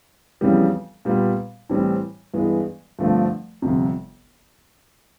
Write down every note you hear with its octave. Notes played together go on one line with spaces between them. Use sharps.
F2 C#3 E3 G3 B3
A#2 G3 B3
A2 E3 G3 C4
G2 E3 G#3 B3
G2 D3 F3 A3 C4
G1 F2 C3